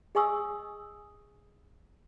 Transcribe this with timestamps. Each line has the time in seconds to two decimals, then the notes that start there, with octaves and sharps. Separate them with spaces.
0.15 G#4 D#5 G#5 C#6 D#6 E6